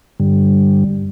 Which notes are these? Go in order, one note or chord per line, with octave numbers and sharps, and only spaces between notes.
G2 D3 G3